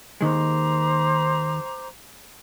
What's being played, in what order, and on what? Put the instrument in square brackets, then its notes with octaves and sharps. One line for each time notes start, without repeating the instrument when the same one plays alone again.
[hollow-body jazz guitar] D#2 D#3 G#3 [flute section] C5 A#5 D6